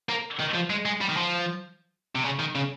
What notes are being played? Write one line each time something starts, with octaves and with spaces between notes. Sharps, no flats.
A#3
D#3
F3
G#3
G#3
G3
D#3
F3
C3
C#3
D#3
C#3